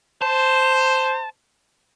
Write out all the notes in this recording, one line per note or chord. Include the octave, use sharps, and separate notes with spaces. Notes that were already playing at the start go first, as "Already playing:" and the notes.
C5 A5